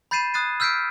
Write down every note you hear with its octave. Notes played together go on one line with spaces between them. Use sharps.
B5 G6 A6 C7 D#7 E7
D#6 F#6 G#6 A6 C7 D#7
E6 F6 G6 B6 C7 D7